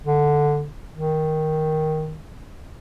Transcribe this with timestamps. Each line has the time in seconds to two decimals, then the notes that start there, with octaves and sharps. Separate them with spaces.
0.05 D3
0.94 D#3